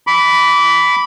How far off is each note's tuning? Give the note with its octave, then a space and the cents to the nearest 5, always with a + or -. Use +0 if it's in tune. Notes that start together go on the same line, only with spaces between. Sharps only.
B5 +0 D6 -25